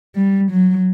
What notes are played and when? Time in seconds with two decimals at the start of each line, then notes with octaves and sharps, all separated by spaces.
0.16 G3
0.51 F#3